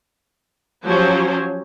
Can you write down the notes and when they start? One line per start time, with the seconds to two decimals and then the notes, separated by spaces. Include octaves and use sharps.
0.86 F3 F#3 C#4 G4 C5